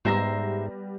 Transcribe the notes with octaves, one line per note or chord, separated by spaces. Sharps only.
G#2 G3 B3 C5 E5 A#5 A#6